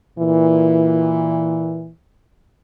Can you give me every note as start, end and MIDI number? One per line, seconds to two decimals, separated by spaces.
0.18 1.90 46
0.18 1.90 52